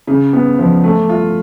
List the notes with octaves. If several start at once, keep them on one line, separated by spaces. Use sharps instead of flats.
C#3
B3
F3
A3
F4